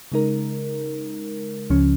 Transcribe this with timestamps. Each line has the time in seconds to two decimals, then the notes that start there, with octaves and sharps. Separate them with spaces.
0.12 C#3 G#3 D#4 A#4
1.70 C#2 C#3 F3 C#4